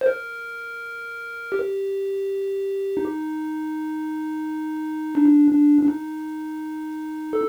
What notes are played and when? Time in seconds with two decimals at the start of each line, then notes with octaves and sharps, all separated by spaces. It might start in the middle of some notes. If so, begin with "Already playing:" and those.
0.01 C5
0.06 A#4
1.52 G4
2.97 D#4
5.15 D4
5.52 D4
5.82 D4
5.88 D#4
7.33 A4